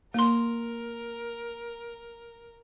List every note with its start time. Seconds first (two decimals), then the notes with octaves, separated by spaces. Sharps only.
0.14 A#3 A#4 C6